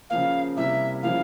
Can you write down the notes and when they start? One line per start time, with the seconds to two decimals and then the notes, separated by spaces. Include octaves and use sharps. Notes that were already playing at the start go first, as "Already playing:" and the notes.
0.10 C#3 F3 A#3 F5
0.57 C3 G3 A#3 E4 E5
1.03 C#3 F3 A#3 E4 F5